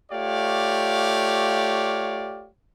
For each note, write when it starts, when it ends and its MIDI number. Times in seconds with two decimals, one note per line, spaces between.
0.11 2.49 57
0.11 2.49 65
0.11 2.49 67
0.11 2.49 73
0.11 2.49 74
0.11 2.49 77